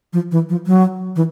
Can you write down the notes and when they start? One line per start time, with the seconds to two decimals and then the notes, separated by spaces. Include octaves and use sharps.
0.13 F3
0.31 E3
0.49 F3
0.67 F#3
1.16 E3